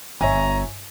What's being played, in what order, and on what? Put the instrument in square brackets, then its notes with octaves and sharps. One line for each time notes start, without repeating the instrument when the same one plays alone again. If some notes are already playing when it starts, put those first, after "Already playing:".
[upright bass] G1 [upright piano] C#5 E5 G#5 [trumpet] A#5